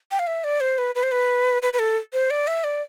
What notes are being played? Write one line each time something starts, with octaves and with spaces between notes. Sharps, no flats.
G5
F5
E5
D5
C5
B4
B4
C5
B4
B4
B4
A4
C5
D5
E5
D5